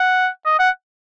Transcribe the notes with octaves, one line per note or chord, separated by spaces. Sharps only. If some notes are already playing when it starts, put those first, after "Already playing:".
Already playing: F#5
D#5
F#5